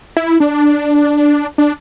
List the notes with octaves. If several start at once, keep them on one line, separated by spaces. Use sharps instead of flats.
E4
D4
D4